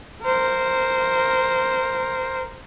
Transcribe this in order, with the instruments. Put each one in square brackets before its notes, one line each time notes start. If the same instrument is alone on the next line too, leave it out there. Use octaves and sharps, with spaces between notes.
[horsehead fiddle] A#4 C5